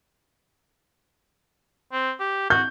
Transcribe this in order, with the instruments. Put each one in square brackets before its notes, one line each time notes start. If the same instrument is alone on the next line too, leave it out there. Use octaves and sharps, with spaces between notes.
[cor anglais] C4
G4
[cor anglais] F#4 [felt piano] G6